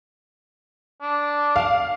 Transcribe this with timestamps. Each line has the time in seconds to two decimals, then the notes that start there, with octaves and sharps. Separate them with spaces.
1.02 D4
1.56 F5